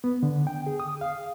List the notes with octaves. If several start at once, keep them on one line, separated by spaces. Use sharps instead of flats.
B3
D3
G5
G#4
D#6
F5